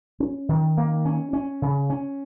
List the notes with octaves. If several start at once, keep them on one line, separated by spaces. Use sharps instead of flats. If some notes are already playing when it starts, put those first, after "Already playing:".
C#4
D#3
A#3
C#4
C#4
C#3
C#4